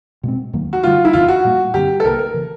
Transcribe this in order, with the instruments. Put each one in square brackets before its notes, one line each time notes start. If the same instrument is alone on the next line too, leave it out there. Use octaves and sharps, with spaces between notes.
[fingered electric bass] B2 G#3 C4
D#2 D#3 F#3 A#3
[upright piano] F#4
[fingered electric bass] G2 D3 G3 [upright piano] F4
[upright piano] E4
[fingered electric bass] E2 C#3 E3 [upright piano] F4
[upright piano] F#4
[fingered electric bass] A#2 G3 A#3
[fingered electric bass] G2 D3 G3 C4 [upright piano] G4
[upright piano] A4
[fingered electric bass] C2 C3 F3 A#3 [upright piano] A#4
[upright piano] A#4
[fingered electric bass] C#3 E3